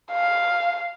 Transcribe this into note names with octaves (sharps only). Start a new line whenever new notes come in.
F5